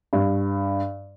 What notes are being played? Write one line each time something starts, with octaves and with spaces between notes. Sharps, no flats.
G2